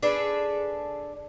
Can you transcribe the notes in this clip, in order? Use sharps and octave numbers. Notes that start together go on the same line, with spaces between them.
D4 G#4 A4 B4